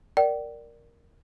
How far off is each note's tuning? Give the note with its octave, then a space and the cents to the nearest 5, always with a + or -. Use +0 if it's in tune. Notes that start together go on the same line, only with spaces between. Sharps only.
A#4 +0 D5 +0 G5 -40